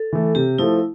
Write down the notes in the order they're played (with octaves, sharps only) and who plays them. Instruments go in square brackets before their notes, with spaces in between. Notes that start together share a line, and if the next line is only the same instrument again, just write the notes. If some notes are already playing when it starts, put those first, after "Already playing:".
Already playing: [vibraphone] A4
[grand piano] E3 A3
[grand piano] C3 [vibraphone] G4
[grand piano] F3 A3 [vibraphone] E4